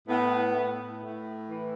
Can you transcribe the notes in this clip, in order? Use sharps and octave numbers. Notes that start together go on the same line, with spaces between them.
A2 B3
A2
A2
E3